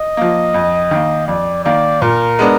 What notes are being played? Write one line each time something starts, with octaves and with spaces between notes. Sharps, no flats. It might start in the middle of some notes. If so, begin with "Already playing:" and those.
Already playing: D#5
F3 A#3
F2
D#3 A#3
F2 D5
D#3 A#3 D5
A#2 A#4
G#3 B3 D4